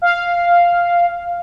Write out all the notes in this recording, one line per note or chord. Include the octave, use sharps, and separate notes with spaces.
F5